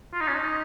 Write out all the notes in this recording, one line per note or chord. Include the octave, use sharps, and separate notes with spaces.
F4
D#4
C#4
D#4